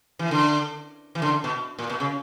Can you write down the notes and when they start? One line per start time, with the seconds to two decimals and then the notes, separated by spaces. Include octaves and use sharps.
0.19 E3
0.31 D3
1.15 E3
1.22 D3
1.44 B2
1.79 A#2
1.90 B2
2.00 C#3